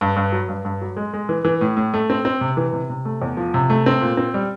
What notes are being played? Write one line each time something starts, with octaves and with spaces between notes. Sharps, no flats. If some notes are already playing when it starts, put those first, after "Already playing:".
G2
G2
F#3
G2
G2
F#3
G#3
G#3
E3
E3
A2
A2
A3
C4
C4
C3
E3
C3
C3
A3
E2
F3
C3
A3
C4
A#2
C4
G3